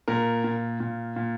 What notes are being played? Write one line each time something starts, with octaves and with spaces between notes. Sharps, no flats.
A#2 A#4
A#2
A#2
A#2